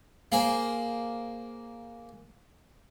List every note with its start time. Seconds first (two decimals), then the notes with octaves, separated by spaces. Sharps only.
0.32 A#3 G#4 C5